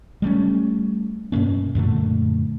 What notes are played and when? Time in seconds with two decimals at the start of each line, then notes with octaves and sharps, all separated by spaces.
0.22 G3 A3 B3 C#4
1.32 G2 B2 A#3 C#4
1.75 F#2 A#2 D3 A3